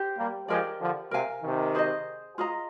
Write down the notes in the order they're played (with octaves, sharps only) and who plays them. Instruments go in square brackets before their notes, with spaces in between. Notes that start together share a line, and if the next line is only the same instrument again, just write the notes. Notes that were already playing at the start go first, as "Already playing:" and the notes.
Already playing: [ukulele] G4 C5 G5
[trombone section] G3 A#3
[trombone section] F3 G#3 [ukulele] G4 A#4 D5
[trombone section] D3 F3
[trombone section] C3 [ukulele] A#4 F5 G#5
[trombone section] C3 D#3
[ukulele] G#4 C5 D#5
F4 G#4 D#5 A#5